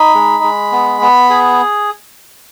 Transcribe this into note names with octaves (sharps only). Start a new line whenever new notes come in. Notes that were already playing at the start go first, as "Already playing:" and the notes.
Already playing: D#4 B5
G#3
G#3
B3
B3
G#4